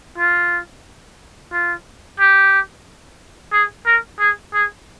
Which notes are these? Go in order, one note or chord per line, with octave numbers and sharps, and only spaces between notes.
F4
F4
G4
G#4
A#4
G#4
G#4